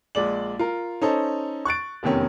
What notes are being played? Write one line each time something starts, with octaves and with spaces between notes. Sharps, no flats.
A#1 G#3 D5 F#7
F4 A#4
C#4 D#4 A4 C5
C#6 F#6 A6 D7
F1 E2 C3 D#3 C#4